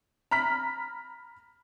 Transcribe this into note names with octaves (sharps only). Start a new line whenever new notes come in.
A#5 B5 F6 B6